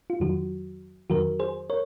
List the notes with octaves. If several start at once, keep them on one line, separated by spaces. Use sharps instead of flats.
F4
F2 D#3 F#3 F#4
F2 D#3 F#3 F#4 A#4
G#4 C5
A#4 C#5